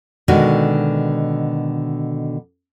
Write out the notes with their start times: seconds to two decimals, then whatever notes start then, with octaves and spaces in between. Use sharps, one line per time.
0.28 B2 D3 D#3 G#3 D#4 F#4